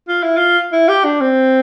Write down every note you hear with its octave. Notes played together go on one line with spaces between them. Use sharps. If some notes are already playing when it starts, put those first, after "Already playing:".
F4
E4
F4
E4
G4
D4
C4